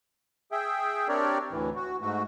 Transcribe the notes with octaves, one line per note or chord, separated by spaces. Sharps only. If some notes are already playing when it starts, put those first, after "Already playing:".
G#4 E5 G5
C4 D4 G4 A#4 C#5 D5
D2 A2 E3
F#4
G#2 A3 F#4